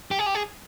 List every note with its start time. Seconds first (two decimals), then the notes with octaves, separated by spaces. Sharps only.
0.11 G4
0.19 G#4
0.26 G4
0.35 G#4